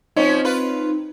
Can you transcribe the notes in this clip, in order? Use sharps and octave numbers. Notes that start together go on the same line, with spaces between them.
F3 C4 C#4 D#4
F4 B4